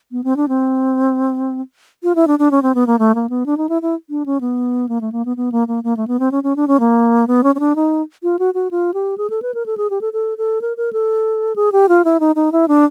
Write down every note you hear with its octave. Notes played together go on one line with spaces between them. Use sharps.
B3
C4
D4
C4
F4
E4
D4
D4
C#4
C4
B3
A#3
A3
A#3
B3
D4
D#4
E4
E4
D4
C#4
B3
A#3
A3
A#3
B3
B3
A#3
A#3
A#3
A3
B3
C4
C#4
C#4
D4
C#4
A#3
B3
C#4
C#4
D4
D#4
F4
F#4
F#4
F4
G4
G#4
A4
B4
A#4
A4
G#4
G4
A4
A4
A4
A#4
A#4
A4
G#4
G4
F4
E4
D#4
D#4
E4
D4